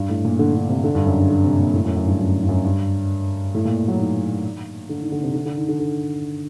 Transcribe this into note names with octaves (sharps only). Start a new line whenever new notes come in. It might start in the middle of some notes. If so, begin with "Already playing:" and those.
Already playing: G2
A2
A#2
D3
D3
C3
D3
G2
F#2
G2
D3
C3
A#2
A2
F#2
F#2
G2
F#2
G2
F#2
G2
A2
A#2
F#3
D#3
D3
D#3
D3
C3
D3
D3
D#3
D3
D3